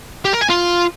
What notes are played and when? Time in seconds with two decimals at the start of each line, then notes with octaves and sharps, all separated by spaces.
0.25 G4
0.33 A#4
0.41 G#5
0.50 F4